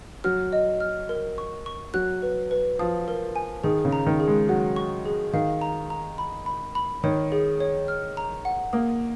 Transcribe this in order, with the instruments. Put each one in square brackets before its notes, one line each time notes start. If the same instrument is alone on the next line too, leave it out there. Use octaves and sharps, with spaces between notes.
[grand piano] F#3 [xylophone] F6
[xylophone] D#5
F6
A#4
C#6
C#6
[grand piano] F#3 [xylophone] F#6
[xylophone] B4
B4
[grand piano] F3 [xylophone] D#6
[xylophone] A#4
G#5
[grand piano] D#3 [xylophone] G#4
[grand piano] C#3
[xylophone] A#5
[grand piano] D#3
[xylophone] G#4
[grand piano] G#3
[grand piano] F#3 [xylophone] F#5
[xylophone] C#6
G#4
[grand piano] D#3 [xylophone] F5
[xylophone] A#5
A#5
B5
B5
B5
[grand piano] D#3 [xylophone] C#5
[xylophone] G#4
C#5
F6
A#5
F#5
[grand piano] A#3 [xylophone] D#6